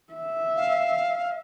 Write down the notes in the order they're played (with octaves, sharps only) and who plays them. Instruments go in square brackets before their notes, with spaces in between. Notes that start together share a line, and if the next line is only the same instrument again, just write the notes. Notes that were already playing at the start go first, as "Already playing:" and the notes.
[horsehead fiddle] E5
[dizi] F5